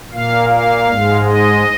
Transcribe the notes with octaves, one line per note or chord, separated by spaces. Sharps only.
A#2 A#3 F5
F5
G#2 G#3
D#5